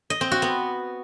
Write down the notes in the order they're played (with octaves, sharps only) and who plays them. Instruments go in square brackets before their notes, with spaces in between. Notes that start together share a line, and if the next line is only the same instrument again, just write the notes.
[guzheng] D#5
C4
F#4
B3